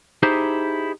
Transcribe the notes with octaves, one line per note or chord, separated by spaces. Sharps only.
D#4 E4 G4 G#4 C5